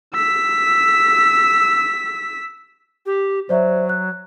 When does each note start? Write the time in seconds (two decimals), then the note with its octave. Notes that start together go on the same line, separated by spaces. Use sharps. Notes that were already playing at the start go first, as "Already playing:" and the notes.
0.14 E6 B6
3.06 G4
3.49 F#3 C5 D5 E5
3.89 F#6